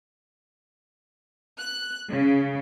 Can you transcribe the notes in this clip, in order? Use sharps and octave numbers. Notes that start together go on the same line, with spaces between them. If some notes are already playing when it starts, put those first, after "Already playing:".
F#6
C#3